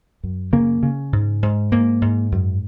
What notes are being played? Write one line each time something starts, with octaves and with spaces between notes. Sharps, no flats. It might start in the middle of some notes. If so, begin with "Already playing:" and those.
F#2
C#3 A#3
C#3
G#2
G#2
G#2 A#3
G#2
F#2